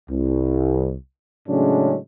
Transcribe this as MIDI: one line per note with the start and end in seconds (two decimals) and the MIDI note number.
0.10 0.94 36
1.48 1.98 45
1.48 1.98 49
1.48 1.98 54
1.48 1.98 56
1.48 1.98 61
1.48 1.98 62